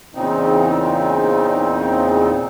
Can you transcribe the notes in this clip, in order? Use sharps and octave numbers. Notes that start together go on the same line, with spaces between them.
E2 A#2 C#3 C4 D#4